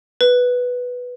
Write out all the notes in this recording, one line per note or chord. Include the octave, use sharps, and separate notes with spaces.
B4